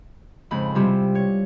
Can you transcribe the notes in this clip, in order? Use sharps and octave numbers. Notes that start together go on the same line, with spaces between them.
F2 G#2 C#3 B5
C3 G3 E4 F4
C#5